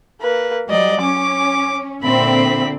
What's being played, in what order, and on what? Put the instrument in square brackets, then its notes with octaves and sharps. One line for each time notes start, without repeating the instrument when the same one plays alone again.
[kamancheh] A#3 B4
[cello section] F#3 G3 [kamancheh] D5 D#5
[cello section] C#4 [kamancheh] D6
[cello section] A#2 D3 C4 [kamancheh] E5 B5